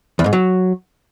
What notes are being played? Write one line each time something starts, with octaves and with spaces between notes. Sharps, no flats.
E2
G#2
F#3